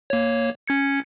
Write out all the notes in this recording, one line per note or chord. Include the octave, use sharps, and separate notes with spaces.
A#3 C#5
C#4 G#6 C#7